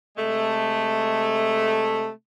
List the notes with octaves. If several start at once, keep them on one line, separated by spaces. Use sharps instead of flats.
C3 G#3 A3